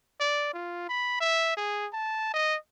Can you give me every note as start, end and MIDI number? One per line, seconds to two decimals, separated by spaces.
0.20 0.49 74
0.53 0.88 65
0.89 1.16 83
1.21 1.56 76
1.57 1.88 68
1.93 2.33 81
2.34 2.56 75